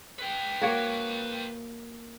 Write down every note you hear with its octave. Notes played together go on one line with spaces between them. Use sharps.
B4 G5
A#3 F#4 C#5